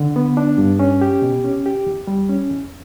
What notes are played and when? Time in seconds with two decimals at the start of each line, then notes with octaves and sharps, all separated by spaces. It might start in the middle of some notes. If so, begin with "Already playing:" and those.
Already playing: D3
0.16 B3
0.37 D4
0.58 G2
0.79 C#4
1.01 G4
1.22 B2
1.44 C#4
1.66 G4
1.86 E2
2.07 G3
2.29 C#4
2.50 E2